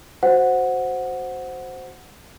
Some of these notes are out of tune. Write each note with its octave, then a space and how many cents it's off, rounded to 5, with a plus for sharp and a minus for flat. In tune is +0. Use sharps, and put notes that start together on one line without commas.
F#4 +0 C5 +0 F#5 -10